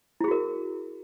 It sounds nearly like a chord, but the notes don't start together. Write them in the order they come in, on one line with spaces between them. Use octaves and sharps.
E4 G#4 F#4 A#4